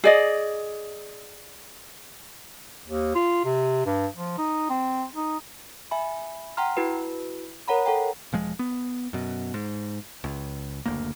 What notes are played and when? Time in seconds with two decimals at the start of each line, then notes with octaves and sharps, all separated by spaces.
0.04 G#4 D5 D#5
2.87 D#2
3.15 F4
3.45 C3
3.85 G2
4.15 F3
4.38 D#4
4.70 C4
5.15 D#4
5.91 E5 G#5 B5
6.57 F#5 G5 A#5 C6 F6
6.77 E4 F#4 B4
7.68 A#4 C#5 F#5 A#5 B5
7.85 A4 F#5 G5 A#5
8.33 E1 F3 G#3
8.59 B3
9.13 F#2 B2
9.54 G#2
10.24 C#2
10.86 F#1 D2 A#3